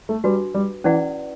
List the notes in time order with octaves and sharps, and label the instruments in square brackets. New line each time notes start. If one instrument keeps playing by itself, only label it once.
[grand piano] A3
[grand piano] G3 [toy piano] D4 F#4 B4
[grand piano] G3
[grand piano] E3 [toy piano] C#4 E4 B4 D5 F#5